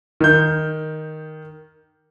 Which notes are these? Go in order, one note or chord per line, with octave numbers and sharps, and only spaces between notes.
D#3 G6